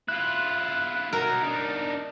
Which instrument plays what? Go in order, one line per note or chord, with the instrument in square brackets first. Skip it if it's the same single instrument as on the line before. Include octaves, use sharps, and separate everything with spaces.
[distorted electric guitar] E4 F4 [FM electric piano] F#6
[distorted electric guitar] F#3 D#4 [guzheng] A#4
[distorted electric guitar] D4 D#4